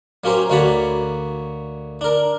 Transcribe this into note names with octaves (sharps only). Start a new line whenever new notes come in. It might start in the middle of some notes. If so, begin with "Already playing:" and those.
F#3 A#3 C#4 G4 C5
D2 A#3 F#4 C#5 A5 B5
D4 A#4